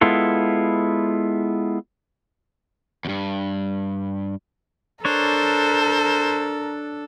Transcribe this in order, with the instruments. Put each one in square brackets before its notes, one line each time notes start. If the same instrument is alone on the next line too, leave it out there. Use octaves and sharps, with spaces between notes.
[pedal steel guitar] G#3 B3 E4 F4 A4
[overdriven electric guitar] E2 G2
[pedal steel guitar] D4 C#5 [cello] A4 [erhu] A#4 [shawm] C5